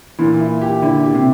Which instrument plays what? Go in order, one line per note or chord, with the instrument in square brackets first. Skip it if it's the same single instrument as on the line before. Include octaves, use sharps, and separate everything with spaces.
[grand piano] A#2 [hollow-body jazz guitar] E3
[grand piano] E4
G4
[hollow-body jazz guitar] D3 [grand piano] E4
[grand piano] G4
[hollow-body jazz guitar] C3